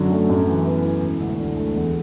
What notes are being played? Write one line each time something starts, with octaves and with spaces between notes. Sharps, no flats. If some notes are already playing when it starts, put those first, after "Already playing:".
Already playing: F#2 D3 F#3
A3
F#2
E3
B3
E4
E1
D2
D3
A3
E2